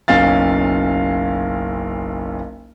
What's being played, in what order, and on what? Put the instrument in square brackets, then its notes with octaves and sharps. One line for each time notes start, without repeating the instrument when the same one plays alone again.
[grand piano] F#1 B1 C#4 F5 A6